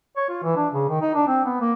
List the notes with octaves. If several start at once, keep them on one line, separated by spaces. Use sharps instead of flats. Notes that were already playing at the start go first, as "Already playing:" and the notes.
C#5
F4
E3
D4
C#3
D#3
D#4
D4
C4
B3
A#3